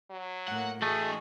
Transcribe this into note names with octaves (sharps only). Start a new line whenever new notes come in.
F#3
A2 A#3 F#5
E3 A3 F#4 G#4 D#5